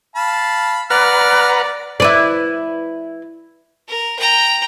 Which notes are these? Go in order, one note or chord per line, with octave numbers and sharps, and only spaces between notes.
F5 A5 B5
B4 D5 F#5 A#5 F6
E4 B4 D5
A#4
G5 A#5